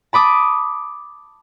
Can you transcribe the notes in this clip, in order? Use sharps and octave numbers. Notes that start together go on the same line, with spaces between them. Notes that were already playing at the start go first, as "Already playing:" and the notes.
A5 B5 D6 D#6